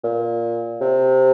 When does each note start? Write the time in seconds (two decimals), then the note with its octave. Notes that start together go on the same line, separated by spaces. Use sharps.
0.04 A#2
0.81 C3